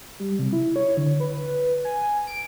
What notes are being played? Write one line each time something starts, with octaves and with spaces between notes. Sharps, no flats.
G3
C3
E4
C#5
D3
B4
G#5
D7